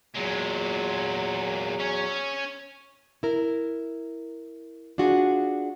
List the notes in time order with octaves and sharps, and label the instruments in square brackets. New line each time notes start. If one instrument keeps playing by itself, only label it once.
[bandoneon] E2 F#3 [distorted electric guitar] A#2 G#3
[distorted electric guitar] C#4 C#5
[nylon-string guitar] E4 A#4
D4 F4 F#4 G#4